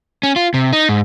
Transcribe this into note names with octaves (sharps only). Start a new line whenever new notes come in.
C#4
F4
C3
D#4
G#2